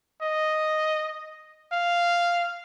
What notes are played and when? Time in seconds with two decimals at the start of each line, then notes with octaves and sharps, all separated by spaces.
0.22 D#5
1.72 F5